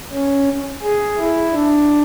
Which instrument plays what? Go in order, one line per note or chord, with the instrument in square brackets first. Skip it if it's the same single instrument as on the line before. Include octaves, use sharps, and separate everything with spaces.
[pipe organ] C#4
G#4
E4
D4